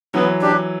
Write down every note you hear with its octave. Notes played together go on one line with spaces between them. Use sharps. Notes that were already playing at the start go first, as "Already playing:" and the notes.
E3 F#3 B3
D4 G4